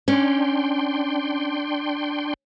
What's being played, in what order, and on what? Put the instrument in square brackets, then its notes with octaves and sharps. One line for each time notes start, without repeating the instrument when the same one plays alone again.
[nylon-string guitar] C#4 [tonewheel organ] D4 G5 C6